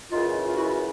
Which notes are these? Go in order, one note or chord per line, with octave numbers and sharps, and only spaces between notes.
F#2 C#3 E3 D#4 F4
F4
E4 F#4